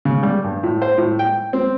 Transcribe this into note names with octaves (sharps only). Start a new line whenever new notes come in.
C#3
G3
G2
A2
C5
A2
G5
C4